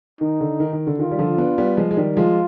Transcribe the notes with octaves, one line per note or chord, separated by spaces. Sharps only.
D#3 D#4
D3
D#3
D#3
D3
D#3 F4
G3
D3 F3
B3 D4
G3 B3
F3 G#3
G#3
D#3 G3
F3 G#3 F4